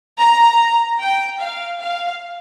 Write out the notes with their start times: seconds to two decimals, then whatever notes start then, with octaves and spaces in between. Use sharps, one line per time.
0.18 A#5
0.99 G5
1.40 F5
1.80 F5